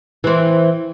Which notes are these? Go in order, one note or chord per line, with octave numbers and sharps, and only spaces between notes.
E3 C4